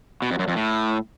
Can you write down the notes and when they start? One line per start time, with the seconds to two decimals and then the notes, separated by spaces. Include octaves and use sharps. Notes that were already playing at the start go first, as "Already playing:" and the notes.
0.22 B2
0.31 F2
0.39 F#2
0.48 F2
0.56 A2